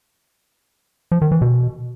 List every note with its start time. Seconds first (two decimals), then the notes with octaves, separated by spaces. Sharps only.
1.12 F3
1.22 D#3
1.32 E3
1.42 B2